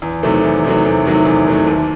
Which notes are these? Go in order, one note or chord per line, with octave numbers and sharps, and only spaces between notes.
E2
C3 D#3 F#3 A3
E2
C3 D#3 F#3 A3
E2
C3 D#3 F#3 A3
E2
C3 D#3 F#3 A3
D#2